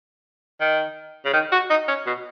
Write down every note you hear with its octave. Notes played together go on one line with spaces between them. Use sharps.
D#3
C#3
D#3
F#4
D#4
C#4
B2